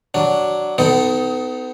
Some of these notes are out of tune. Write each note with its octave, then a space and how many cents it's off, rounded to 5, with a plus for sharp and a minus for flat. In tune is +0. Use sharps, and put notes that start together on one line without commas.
F#3 +10 D4 +0
B3 +40 D#4 +15 A4 +0